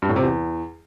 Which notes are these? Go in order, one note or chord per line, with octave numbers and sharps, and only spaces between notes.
G2
A2
C3
E2